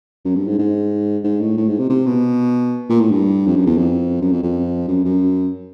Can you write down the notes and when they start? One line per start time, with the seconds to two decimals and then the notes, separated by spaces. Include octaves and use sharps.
0.25 F#2
0.36 G2
0.47 G#2
0.58 G#2
1.24 G#2
1.41 A2
1.57 A2
1.69 G#2
1.79 C3
1.90 C3
2.07 B2
2.89 A#2
3.01 A2
3.11 G2
3.47 F2
3.56 F#2
3.66 E2
3.77 F2
4.22 F#2
4.32 F2
4.43 F2
4.88 F#2
5.04 F#2